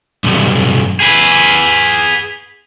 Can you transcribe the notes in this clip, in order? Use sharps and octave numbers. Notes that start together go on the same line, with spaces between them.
B1 G2
G#4 B4